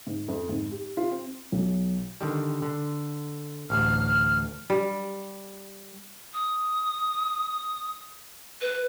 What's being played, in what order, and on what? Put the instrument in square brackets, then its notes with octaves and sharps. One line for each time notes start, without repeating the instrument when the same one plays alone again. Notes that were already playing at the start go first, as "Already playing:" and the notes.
[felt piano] G#2
F2
G#2
G4
F4
C4
B1
[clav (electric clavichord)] D3 D#3 G3
D3
[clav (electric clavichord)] A1 D2 [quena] F6
[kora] G3
[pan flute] D#6
B4